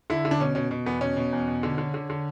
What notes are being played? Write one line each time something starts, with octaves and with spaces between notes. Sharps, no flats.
D3 E4
D3
D4
B2 C#4
B2 C#4
B2
E2 B3
B2 C#4
B2
E2
B2
D3
D3
D3
D3